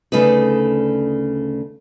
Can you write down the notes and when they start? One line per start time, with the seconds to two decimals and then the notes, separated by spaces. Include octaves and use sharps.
0.12 D2 C#3 A3 D#4 B4